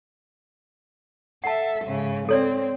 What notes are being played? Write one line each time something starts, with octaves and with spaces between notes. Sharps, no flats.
A4 E5 F#5 A5
G#2 C#3
C4 A4 C#5 D5